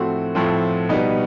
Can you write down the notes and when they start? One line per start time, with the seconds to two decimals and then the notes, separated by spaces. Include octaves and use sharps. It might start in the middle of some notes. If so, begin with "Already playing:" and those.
Already playing: A2 F3 A3 C4 F#4
0.35 A2 F3 A3 C4
0.89 B2 G3 B3 D#4